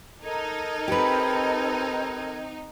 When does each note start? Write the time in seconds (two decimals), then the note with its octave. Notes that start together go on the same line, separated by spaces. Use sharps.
0.22 D#4 A4 A#4 G#6
0.88 C4 G4 B4